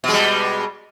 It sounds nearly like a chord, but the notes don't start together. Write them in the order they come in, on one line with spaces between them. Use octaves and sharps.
B2 G#3 G3